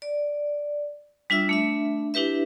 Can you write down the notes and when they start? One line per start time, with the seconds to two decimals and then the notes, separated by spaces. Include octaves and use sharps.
0.02 D5
1.30 G3 D4 F4 E5 E6
1.49 A3 D4 E5
2.14 D4 E4 G4 B4 E5